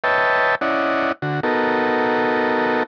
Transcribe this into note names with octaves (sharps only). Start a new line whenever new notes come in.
B4 C#5 D#5 E5 G5 A5
C#4 E4 D5 D#5 F#5
D3 F#4
B3 D#4 F#4 A4 A#4